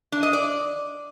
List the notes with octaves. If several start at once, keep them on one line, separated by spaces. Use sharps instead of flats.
D4
D#5
D5